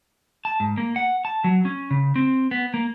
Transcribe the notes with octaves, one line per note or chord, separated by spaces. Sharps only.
A5
G#2
A#3
F#5
A5
F#3
C#4
C#3
C4
B3
A#3